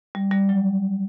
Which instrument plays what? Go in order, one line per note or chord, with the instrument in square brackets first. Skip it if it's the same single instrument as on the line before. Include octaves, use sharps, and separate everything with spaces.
[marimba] G3
G3
F#3